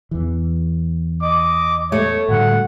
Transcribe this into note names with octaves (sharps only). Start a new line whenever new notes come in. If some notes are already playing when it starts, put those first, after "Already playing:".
E2 E3
D#5 D6
A3 C#5
A2 D3 G3 F#4 F#5